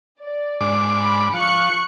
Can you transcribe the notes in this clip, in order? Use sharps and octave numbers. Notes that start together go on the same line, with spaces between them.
D5
G#2 D4 D6
B5
F3 C#6 F#6 C#7